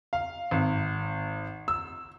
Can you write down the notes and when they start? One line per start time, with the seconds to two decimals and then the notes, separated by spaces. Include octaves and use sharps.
0.13 F5
0.51 G#1
1.68 E6